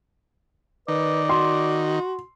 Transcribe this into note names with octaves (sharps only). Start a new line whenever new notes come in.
D#3 B4 D5
F#4 C6